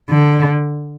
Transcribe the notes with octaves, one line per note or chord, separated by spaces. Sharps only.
D3